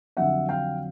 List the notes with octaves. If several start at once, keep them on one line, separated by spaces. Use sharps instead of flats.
F2 D3 F#3 E5 F#5
F5 G5